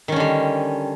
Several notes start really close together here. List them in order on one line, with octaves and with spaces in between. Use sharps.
D#3 C#4 D3 G3